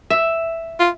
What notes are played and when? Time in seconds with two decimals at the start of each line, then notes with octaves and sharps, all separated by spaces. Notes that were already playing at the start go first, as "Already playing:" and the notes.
0.10 E5
0.79 F4